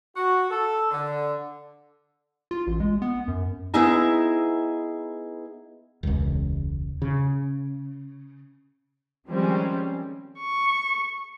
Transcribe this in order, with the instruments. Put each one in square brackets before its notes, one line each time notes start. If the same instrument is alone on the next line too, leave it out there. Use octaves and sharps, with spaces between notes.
[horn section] F#4
A4
D3
[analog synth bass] F4
A1
G#3
B3
F#2
[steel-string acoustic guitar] B3 D#4 E4 G#4 E5 A#5
[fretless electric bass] E1 C#2
C#3
[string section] D#3 F3 G3 G#3 C4 C#4
[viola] C#6